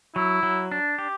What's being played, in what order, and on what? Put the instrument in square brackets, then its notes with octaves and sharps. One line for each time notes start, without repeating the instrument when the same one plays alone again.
[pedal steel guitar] F#3 [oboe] E4
[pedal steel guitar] F#3
D4
G4